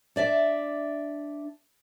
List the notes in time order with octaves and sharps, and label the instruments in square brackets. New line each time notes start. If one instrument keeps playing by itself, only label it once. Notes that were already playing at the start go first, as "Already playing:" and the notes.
[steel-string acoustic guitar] D4 D5 E5